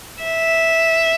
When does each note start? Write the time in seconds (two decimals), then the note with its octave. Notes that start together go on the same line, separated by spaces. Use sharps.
0.23 E5